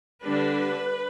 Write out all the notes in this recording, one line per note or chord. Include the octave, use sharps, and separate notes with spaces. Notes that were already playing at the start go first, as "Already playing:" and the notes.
D3 G3 D4 B4